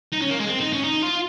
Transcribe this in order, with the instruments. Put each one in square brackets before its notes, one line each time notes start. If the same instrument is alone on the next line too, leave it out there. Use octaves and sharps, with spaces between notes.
[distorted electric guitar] D#4
C#4
A#3
G#3
C4
D#4
C#4
D#4
F4